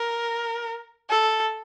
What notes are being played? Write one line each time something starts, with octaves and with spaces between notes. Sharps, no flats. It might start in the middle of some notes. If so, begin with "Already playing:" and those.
Already playing: A#4
A4